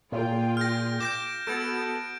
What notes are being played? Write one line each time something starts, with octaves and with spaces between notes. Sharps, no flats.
A#2 F4 G#4 G5
F6 G6 A#6
D6 G6 A#6 E7
B3 F#4 A4 G#6 D7